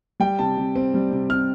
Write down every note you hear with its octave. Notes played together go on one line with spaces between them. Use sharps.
G3 G5
C3 A5
C3
C4
G3
C3
C3 F6